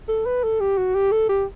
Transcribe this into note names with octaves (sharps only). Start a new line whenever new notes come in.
A4
B4
A4
G4
F#4
G4
A4
G4